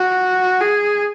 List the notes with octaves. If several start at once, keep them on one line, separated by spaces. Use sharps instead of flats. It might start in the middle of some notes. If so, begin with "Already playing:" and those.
Already playing: F#4
G#4